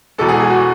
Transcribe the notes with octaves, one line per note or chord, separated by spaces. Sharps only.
E1 E2 B2 G#3 A4
G#4
G#4
F#4